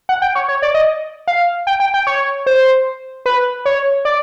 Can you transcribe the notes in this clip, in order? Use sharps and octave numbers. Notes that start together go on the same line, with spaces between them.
F#5
G5
C#5
C#5
D5
D#5
F5
G5
G5
G5
C#5
C5
B4
C#5
D5